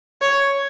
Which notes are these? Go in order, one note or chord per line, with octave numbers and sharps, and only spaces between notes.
C#5